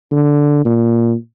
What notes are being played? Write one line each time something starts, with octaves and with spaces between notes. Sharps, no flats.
D3
A#2